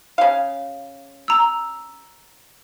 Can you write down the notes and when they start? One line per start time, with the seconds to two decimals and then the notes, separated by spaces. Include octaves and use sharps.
0.18 C#3 F5
1.28 A#5 E6